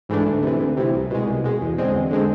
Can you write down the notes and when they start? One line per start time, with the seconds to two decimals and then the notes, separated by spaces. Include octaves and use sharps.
0.09 G#2 E3 A3 D4
0.26 D2
0.43 C3 E3
0.60 D2
0.77 C3 E3
0.94 C2
1.10 B2 G#3
1.27 C2
1.44 B2 G#3
1.61 E2
1.78 D3 G#3 C4
1.94 E2
2.11 D3 G#3 C4